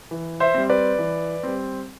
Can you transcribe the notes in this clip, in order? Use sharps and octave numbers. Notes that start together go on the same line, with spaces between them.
E3
C5 E5
G3 C4
B4 D5
E3
G3 C4